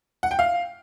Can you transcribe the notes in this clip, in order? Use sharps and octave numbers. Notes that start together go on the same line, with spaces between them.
F#5
G5
F5